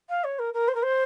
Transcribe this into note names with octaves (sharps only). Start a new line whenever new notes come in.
F5
C#5
A#4
A#4
C5
A#4
C5